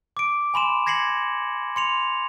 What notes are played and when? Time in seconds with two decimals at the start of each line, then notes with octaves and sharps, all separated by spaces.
0.17 D6 D7
0.54 G#5 B5 C6 E7
0.86 G#6 A#6 C7 C#7 F#7
1.76 C6 C#7 F7